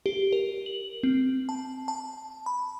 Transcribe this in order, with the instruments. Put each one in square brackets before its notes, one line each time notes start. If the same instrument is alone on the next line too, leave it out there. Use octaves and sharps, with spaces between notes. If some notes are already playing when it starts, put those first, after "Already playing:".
[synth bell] G4
A#4
F#7
C4
A5
A5
B5